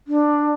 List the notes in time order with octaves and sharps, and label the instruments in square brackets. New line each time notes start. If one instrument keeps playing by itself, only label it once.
[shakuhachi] D4